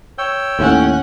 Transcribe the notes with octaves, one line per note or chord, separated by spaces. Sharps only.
C#5 G5 E6
D#2 A2 C#4 F#5